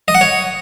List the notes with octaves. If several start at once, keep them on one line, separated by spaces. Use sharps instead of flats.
D#5
F#5
C#5